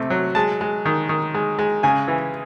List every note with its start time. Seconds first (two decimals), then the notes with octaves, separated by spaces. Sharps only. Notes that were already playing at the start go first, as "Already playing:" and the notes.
Already playing: C3 A3
0.10 F#3
0.35 G#3 A5
0.61 G#3
0.85 D#3
1.09 D#3
1.35 G#3
1.59 G#3
1.83 C#3 G#5
2.08 E3